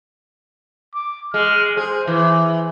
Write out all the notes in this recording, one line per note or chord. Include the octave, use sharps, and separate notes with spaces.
D6
G#3 F6
G#4 C5
E3